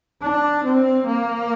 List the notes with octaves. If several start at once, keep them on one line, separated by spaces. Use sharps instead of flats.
D4
C4
A#3